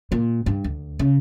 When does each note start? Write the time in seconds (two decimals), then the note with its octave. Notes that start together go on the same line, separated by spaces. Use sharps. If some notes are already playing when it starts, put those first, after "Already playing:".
0.12 A#2
0.46 G2
0.64 D2
0.99 C#3